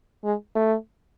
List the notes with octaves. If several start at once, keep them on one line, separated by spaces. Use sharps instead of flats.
G#3
A3